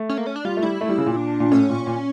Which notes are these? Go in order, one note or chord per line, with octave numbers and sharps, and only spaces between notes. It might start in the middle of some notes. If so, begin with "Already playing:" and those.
Already playing: A3
C#4
A#3
C#4
D4
G3 F4
A3
G3 E4
A3
G3
C#3
A#2
D4
A#2
A2 C#4
A#2
A#2